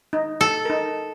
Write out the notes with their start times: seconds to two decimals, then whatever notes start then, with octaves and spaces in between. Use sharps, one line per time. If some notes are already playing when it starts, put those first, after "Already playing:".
0.13 D#4
0.41 A4
0.65 D#4 A#4